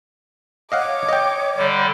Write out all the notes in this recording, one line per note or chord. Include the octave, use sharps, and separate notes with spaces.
C#5 D#5 F5 F#5 D6
D#5 G5
D3 G3